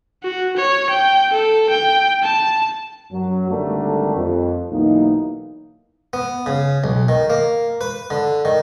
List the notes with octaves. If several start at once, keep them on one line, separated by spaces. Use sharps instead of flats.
F#4
C#5
G5
A4
G5
A5
F#2 F#3
G#1 D3 G3 A3 D4 A#4
F2
B1 E3 A#3 D#4
B3
C#3
B1
D#3
A#3
B4
D3
D#3